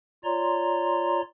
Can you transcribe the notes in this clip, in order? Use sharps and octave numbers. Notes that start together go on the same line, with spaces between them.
F4 C#5 D5 A#5 C6